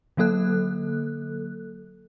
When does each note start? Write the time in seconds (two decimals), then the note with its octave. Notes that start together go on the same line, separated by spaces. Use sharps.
0.17 D3 F#3 A#3 A4 F#6